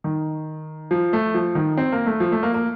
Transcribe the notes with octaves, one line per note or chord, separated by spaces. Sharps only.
D#3
F3
A3
F3
D#3
C4
A#3
A3
F3
A3
A#3
A#3